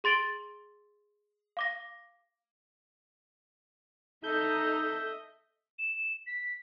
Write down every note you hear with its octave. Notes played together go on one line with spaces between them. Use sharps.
G#4 C6 A6 D7 F#7 G7
F5 D6 A#6
D#4 A4 D#5 E5 G6
E7
B6